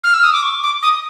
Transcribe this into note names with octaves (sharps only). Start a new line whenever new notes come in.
F6
E6
D#6
D6
C#6
D6
D#6